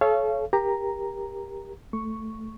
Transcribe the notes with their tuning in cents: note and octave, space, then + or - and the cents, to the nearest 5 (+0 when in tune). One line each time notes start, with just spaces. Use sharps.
A4 -35 C#5 +0 F5 -35
G4 +15 A#4 +20 A#5 +0
A3 +0 C#6 +0